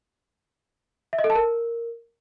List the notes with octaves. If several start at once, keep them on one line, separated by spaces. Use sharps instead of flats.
E5
D#5
A4
A5
A#4